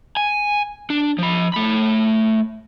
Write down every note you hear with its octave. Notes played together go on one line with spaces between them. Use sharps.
G#5
D4
F3 B5
A3 B5